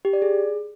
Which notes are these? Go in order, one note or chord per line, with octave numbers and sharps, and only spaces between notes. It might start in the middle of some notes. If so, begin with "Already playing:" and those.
G4
D5
G#4